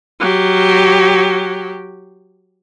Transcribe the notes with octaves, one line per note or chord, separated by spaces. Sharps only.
F#3 G4